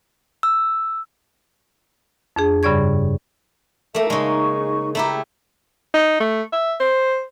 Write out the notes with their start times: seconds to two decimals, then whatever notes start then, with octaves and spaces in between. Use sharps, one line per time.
0.43 E6
2.36 F2 D4 G#4
2.63 G2 C#3 G3 D5 C#6 G#6
3.95 A3 A#3 A4 A#4 E5
4.10 C#3 G#3 D#4 C#6
4.95 A3 E4 G4 A#5
5.94 D#4
6.20 A3
6.52 E5
6.80 C5